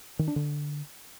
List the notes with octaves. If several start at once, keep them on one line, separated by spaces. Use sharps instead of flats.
D#3
D4
D3